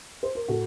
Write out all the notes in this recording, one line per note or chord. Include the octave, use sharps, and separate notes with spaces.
C5
A#4
A2 F#4 A4